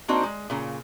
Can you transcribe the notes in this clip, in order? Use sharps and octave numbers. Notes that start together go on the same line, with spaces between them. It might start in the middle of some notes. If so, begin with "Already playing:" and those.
A#3 C4 D4 D#4 F#4 C5
G#3
A#2 C#3